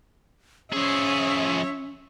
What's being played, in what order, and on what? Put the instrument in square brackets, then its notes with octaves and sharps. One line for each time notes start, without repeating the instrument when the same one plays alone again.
[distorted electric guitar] F3 G#4 [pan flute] C#4 [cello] C#5 E5